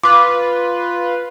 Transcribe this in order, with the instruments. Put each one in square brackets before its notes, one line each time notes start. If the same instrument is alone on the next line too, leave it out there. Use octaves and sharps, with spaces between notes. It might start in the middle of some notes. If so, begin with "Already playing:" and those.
[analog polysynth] F4 B4 [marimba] D6